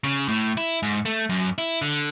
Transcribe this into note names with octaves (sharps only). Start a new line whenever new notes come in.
C#3
A2
E4
G#2
A3
F#2
E4
D3